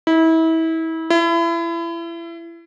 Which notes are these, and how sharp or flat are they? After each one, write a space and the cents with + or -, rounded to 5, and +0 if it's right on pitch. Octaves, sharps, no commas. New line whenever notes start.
E4 -30
E4 +30